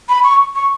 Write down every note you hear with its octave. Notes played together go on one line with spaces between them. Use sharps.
B5
C#6
C#6